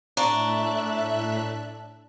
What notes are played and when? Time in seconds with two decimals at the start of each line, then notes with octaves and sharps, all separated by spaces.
0.17 A2 D4 E5 A#5 C#6 F#6